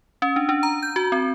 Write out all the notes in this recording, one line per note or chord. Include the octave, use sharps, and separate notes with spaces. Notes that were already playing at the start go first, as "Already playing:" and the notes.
C#4
D4
D4
A#5
G6
F#4
C4